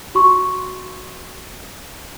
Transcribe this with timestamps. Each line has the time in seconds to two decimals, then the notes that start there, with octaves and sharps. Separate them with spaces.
0.15 F#4 C6 C#6